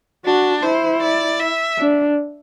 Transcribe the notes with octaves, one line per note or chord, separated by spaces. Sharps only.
D4 F#4
E4 C5
D5
E5
D4